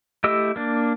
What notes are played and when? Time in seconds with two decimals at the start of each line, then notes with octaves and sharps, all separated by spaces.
0.24 A3 E4 G4 D#5 E6
0.56 A#3 D4